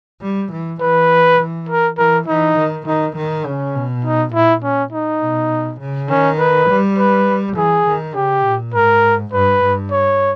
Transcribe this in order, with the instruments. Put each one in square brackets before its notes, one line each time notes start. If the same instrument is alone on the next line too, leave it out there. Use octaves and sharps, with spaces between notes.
[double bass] G3
E3
[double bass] E3 [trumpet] B4
[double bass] E3
[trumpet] A#4
[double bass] E3 [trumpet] A#4
[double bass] E3 [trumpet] D#4
[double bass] D#3
[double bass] D#3 [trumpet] D#4
[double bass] D#3
[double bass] C#3 [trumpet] C#4
[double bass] B2
[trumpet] D#4
[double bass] A#2 [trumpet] E4
[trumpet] C#4
D#4
[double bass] B2
C#3
[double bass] D#3 [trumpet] C#4
[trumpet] B4
[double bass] G3
[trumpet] B4
[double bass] E3 [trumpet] G#4
[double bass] D#3
[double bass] C#3 [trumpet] G4
[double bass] A#2
[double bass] G#2 [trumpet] A#4
[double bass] G2 [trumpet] B4
[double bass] G2
[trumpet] C#5